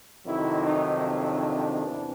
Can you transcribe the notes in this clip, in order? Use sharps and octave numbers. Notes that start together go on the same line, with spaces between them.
F2 C3 D#3 F#3 E4
D#4
D4
E2 C3 E3